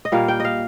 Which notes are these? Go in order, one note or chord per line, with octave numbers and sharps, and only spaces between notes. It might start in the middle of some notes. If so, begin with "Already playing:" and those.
D#5
A#2 G3 A#3 F5
G5
D#5 F5